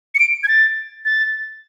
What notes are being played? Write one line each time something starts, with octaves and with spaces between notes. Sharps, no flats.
C#7
D7
G#6
A6
A6